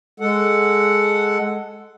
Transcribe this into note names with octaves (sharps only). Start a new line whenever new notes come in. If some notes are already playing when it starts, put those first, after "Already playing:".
G#3 A4 F#5